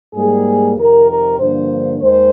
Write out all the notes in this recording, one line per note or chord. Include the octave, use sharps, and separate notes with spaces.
G#2 G3 A#3 G#4
F2 C3 D#3 A#4
A#4
G2 D3 F3 A#3 C5
D#2 D#3 G#3 C5